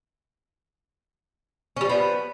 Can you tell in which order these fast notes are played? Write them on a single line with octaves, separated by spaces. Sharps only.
C#4 G3 F3 B3